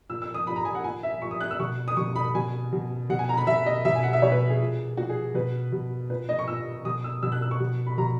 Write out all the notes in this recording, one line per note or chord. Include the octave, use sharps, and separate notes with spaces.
A#2 E6
E6
D#6
A#2 B5
A#5
G#5
F#5
A#2 G#5
E5
A#2 C#6
D#6
F#6
E6
B2 C#6
D#6
B2 C#6
B5
B2 G#5
B2
B2 F#5
G#5
A#5
B5
B2 E5
D#5
B2 E5
G#5
F#5
E5
B2 C#5
B4
G#4
A#2
A#2 F#4
G#4
B2 B4
B2
A#2 B4
D#5
C#6
A#2 E6
B2 D#6
E6
B2 E6
F#6
E6
C#6
B2
B5
B2 A#5